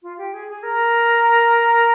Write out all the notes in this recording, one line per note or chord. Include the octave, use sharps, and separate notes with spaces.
F4
G4
G#4
G#4
A#4